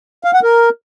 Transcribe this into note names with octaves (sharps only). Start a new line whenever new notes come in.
F5
F#5
A#4